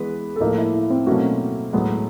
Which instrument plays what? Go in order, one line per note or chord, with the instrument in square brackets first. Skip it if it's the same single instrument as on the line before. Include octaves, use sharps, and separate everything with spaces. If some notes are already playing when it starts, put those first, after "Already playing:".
Already playing: [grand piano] E3 G#3 B3 [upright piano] B4
[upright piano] A4
[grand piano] A2 F3 A#3 D#4 [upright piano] A#4
[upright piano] E4
E4
C4
[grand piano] B2 F#3 A#3 C#4 F#4 [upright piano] A3
[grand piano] A2 F#3 B3 [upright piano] G#3